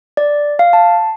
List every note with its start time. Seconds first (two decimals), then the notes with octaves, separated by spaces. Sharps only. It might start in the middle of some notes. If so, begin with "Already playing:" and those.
0.17 D5
0.59 F5
0.73 A5